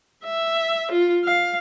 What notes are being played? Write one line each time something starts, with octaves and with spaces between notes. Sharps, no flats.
E5
F4
F5